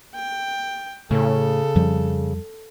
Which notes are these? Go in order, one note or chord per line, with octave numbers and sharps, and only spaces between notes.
G5
A2 C#3 A4
F2 F3 G3